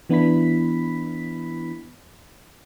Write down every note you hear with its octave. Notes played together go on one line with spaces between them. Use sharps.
E3 B3 D4 E4 B5 B6